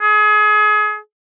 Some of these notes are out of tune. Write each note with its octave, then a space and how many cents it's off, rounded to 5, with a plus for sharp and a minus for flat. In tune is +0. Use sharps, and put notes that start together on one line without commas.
G#4 +30